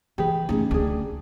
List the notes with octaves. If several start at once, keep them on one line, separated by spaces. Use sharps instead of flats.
E3 G4 G#4 B4
A3 C#4 D#4 G#4
D2 A3 D4 G#4